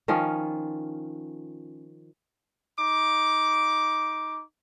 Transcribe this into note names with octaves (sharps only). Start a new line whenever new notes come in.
D#3 F3 C#4 F4
D#4 D6